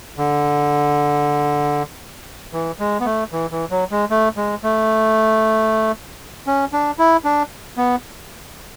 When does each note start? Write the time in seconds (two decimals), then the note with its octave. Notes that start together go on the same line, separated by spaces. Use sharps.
0.18 D3
2.53 E3
2.79 G#3
3.00 B3
3.06 A3
3.33 E3
3.51 E3
3.71 F#3
3.91 G#3
4.10 A3
4.37 G#3
4.63 A3
6.47 C#4
6.73 D4
6.99 E4
7.24 D4
7.77 B3